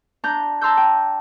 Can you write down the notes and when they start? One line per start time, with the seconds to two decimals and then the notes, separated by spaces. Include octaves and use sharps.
0.24 D4 A#5 G6
0.61 A5 A#5 C6 D6 E6 G6
0.77 G5